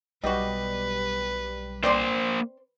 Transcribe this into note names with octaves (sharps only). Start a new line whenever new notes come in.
B1 G3 F#4 B4 D#5
A#3 C4 C5 D5 C6